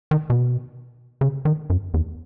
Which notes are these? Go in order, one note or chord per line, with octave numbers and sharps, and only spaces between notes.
D#3
B2
C#3
D#3
F#2
E2